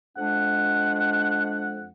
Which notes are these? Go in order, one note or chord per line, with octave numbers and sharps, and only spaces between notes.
F2 G#3 D4 F#5